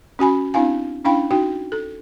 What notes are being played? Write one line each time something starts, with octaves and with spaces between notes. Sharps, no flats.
C#4 F#4 G#5 B5
C4 D4 E4 F5 G#5
C#4 D4 E4 F5 G5 B5
D#4 F#4 G5
A4